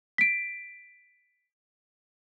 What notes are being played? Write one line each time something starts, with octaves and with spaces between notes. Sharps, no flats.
B6 D7